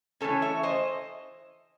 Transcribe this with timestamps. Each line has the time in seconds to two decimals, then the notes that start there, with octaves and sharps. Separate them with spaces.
0.21 E3 A3 C#4 A4 C#5
0.42 C#5 E5
0.63 C5 D#5